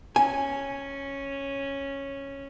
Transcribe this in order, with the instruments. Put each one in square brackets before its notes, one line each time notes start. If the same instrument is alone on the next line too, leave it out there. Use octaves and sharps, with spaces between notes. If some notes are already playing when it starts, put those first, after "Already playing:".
[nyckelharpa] C#4 [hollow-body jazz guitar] G#5